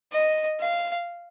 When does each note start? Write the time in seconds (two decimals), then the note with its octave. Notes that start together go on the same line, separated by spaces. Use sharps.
0.12 D#5
0.60 F5